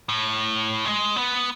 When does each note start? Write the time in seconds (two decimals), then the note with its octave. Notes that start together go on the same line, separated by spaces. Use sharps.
0.09 A2
0.85 G#3
1.16 B3